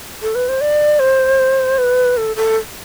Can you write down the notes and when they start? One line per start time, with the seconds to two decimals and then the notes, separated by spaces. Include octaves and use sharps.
0.22 A4
0.35 B4
0.49 C5
0.61 D5
1.00 C5
1.78 B4
2.17 A4
2.36 A4